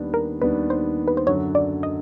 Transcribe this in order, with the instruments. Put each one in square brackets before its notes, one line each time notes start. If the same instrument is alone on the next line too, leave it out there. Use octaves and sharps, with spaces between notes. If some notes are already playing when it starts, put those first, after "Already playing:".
Already playing: [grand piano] D#2 D#3 G3 B3 D4
[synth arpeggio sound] A#4
[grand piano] D#2 D#3 G3 B3 D4 [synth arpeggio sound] B4
[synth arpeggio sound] C5
B4
C5
[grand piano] F#2 D3 F#3 [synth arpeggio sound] C#5
[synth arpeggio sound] D5
D#5